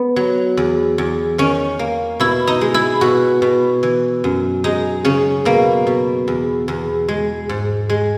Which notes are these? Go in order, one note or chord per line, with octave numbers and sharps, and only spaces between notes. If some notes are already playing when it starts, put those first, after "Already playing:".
Already playing: B3
F#3
E2
E2
D#3 C#4
A#3
B2 E4
D#4
G#3
E4
B2 F#4
B2
E3
F#2
G#3 D#4
C#3 C#4
B2 A#3
B2
E2
E2
G#3
G#2
G#3